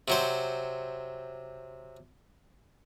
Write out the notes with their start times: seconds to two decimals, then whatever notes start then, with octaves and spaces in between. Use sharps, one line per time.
0.08 C3 F#3 C5